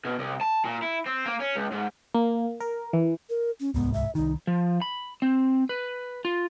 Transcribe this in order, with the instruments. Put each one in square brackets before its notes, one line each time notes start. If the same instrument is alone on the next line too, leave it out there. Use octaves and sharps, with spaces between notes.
[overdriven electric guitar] B2
C2
A5
A#2
E4
C4
A#3
C#4
C#2
G#2
[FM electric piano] A#3
A#4
E3
[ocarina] A#4
C#4
[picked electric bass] D1 C2 G#2 [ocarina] B3
[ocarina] E5
[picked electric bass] C2 D#3 [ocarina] D#4
[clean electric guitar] F3
B5
C4
B4
F4